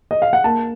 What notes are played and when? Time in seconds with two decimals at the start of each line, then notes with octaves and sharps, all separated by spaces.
0.11 D#5
0.22 F5
0.33 F#5
0.44 A#3 A5